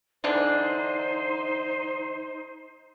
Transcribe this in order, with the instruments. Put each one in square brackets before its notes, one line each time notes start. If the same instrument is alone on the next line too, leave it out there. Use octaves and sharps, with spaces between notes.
[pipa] D3 E3 D4 [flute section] D#4 C5